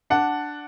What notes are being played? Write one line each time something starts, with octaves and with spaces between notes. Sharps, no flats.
D4 F#5